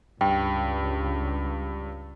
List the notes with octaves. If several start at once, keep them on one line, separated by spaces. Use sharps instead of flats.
C#2 G2 G5